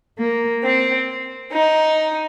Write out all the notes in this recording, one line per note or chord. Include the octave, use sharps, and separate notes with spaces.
A#3
C4
D#4